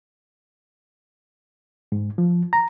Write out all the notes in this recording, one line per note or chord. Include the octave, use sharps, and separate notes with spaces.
G#2
F3
A#5